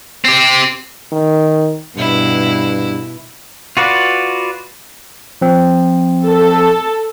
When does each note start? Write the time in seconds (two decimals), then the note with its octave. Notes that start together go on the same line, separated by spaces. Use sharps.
0.25 C4 G4
1.12 D#3
1.97 G2 B2 E4
3.77 F4 F#4 B4 D5
5.41 F3 C4
6.26 A4